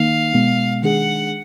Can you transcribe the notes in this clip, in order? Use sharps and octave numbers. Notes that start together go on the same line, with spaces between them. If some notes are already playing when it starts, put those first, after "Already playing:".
Already playing: D#3 A#3 D#4 F5
B2 G#3 B3
D#3 G#3 D4 G#4 F#5